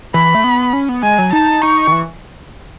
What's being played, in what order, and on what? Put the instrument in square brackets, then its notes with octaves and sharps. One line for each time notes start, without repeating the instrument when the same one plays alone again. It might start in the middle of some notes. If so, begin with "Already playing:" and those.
[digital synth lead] E3 [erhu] B5
[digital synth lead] A3
B3
C#4
B3
[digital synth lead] G#3 [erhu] G#5
[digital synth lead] F#3
[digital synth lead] D#4 [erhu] A5
[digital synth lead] D#4 [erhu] C#6
[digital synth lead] D#3
E3